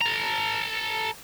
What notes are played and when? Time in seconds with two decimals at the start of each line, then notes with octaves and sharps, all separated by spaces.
0.01 A4 A#5